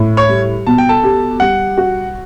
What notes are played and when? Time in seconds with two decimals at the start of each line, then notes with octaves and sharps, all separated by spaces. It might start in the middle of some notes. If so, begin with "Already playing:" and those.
Already playing: A2
0.17 C#5 C#6
0.29 G3
0.67 B2 A5
0.78 G5
0.89 A4 A5
1.04 G4
1.40 G3 F#5
1.78 F#4